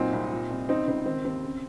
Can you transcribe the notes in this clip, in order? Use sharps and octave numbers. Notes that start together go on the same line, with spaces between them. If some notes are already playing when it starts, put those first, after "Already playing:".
Already playing: A#2 F#3 C4 D#4
C2
A#2
C2
C#3 C4 D#4
C#2 C4
D#3 C4
D#2 C4
C#3